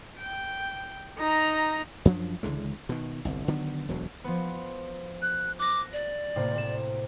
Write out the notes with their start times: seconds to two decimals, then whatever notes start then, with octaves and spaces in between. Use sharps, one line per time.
0.20 G5
1.18 D#4 A#5
2.05 F#2 F3 F#3 D4
2.43 C#2 D3 E3 G#3
2.89 B2 D#3
3.25 G1 C2
3.48 D3 D#3 F#3 B3
3.89 E1 D2 F#3
4.24 F3 B3
5.22 F#6
5.59 D6 F#6 A#6
5.93 D5
6.36 A2 C3 A#3
6.55 C3 E7